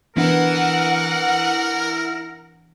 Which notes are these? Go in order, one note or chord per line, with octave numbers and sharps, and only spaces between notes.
E3 B3 D4 E4 A#4 B4 F#5